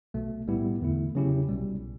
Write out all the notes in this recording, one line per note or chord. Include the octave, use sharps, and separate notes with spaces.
B1 B2 A3
A2 G3 B3 E4 G4
E2 D3 A3 E4
C#3 F#3 C#4 E4 G4
B1 B2 G3